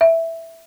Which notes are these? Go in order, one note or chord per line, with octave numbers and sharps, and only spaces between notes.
E5